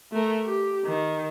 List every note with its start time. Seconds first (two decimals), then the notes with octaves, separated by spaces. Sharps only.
0.12 A3 A#4
0.45 G4
0.85 D#3